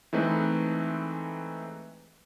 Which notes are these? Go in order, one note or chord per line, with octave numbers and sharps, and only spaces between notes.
E3 G#3 A3 C4 D#4 B4